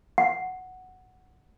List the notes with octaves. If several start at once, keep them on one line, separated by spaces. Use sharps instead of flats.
F#5